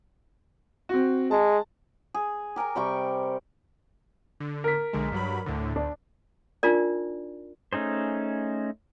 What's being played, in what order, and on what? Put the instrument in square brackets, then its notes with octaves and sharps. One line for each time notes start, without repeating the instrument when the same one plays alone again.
[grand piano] C4 F#4
[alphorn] G#3 [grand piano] A5
[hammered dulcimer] G#4
G4 A#4 G#5 A#5
C3 G3 G5 C#6
[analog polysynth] D3
[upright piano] A#4 B6
[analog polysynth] B1 D3 G#3
G2 F#3 B5
D2 A2 D3
[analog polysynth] D2 [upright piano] D4
[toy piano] D4 D#4 F4 A#4 D5
[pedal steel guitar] A3 C#4 D#4 G#4 C5